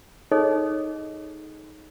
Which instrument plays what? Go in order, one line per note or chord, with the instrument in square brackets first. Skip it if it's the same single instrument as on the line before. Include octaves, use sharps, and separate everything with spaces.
[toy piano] D#4 G#4 A4 C#5 D#5